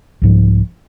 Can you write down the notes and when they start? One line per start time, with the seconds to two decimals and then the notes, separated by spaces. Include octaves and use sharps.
0.22 C2 G#2 F3